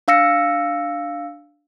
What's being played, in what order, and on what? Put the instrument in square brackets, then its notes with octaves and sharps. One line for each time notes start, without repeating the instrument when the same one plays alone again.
[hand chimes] D4 F5 E6 A#6 C#7